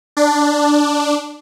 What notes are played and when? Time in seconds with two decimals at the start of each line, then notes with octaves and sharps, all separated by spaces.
0.17 D4